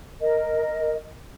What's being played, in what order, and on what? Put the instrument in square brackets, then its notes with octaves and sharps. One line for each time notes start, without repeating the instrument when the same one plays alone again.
[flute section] A#4 D#5